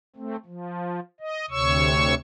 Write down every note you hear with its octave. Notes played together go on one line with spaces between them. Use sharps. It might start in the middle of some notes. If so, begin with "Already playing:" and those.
A3 C4
F3
D#5
D2 C3 C#5 C#6 E6